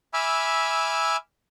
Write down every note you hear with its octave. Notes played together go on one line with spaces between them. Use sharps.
E5 G#5 B5 D6 E6 F6